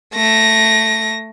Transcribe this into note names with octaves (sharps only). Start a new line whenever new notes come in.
A3 A#6